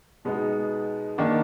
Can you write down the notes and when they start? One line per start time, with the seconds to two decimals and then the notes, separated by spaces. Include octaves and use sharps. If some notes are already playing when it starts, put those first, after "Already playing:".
0.25 B2 G#3 B3 D#4
1.18 D#3 A#3 D4